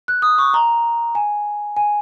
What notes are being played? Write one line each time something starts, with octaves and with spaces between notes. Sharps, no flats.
F#6
D#6
C#6
A#5
G#5
G#5